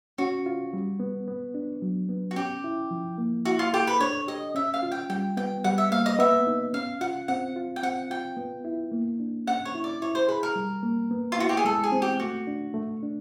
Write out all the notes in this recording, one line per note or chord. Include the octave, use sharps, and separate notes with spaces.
C#4 F#4
F4
G3
B3
B3
D4
F#3
B3
F#4
C#4 G4
E4
F3
A#3
E4 F#4
F4
G4 A4
B4
D4 C#5
G4 D#5
C#4 E5
F5
F4
G5
G3 G5
B3 G5
G3 F#5
E5
A#3 F5
D#5
B3 E5
D#4
C#4 F5
F4 F#5
C4 F#5
F4
G5
C4 F#5
F4 G5
B3
E4
A#3
D4
C#4 F#5
C#5
E4
D5
E4 C#5
C5
G#4 B4
A#4
G3
A#3
B3
F4
E4 F#4
G4
G#4
G#3 A4
G#4
C4
G4
A3 F#4
D4
A3
D4